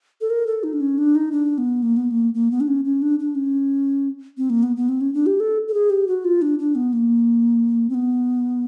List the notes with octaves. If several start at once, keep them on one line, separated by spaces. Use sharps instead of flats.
A4
A#4
A4
D#4
D4
C#4
D4
D#4
D4
B3
A#3
B3
A#3
A#3
B3
D4
C#4
C#4
D4
D4
C#4
C4
A#3
B3
B3
C4
C#4
D4
G4
A4
A4
G#4
G4
F#4
F4
D4
D4
B3
A#3
C4
B3